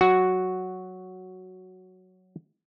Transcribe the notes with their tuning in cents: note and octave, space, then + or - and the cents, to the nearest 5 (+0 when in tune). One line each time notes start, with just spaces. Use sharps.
F#3 +0 F#4 +0